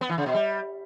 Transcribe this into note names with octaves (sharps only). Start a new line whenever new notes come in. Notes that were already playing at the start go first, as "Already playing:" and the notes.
B3
E3
C#3
B2
G3